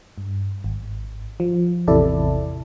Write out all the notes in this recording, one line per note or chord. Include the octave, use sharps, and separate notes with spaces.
G2
G#1
F3
A1 E2 C3 E4 A4 D5